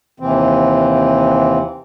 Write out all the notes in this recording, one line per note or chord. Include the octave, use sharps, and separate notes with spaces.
D#2 C3 E3 C4